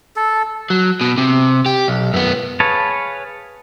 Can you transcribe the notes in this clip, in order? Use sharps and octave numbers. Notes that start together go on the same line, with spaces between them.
A4
F#3
B2
C3
G4
B1
F#2 B3
G#4 B4 C#5 F5 A5